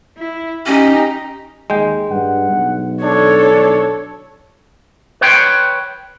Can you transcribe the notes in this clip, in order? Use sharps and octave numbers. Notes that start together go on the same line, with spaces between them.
E4
C#4 D#4 G4
D#2 G#3 G5
G2 F#5
B1
D4 A4 C#5
D4
B4 C#5 G5 B5 C6